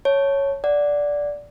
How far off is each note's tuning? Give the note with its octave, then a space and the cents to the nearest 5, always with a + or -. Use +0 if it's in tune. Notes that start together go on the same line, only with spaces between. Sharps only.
C#5 +0 A5 +0
D5 -10 F#5 +0